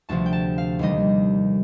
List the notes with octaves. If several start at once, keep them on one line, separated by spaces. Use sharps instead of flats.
D2 C3 F3 A5
G5
A5
F5
D#2 D#3 G3 D#5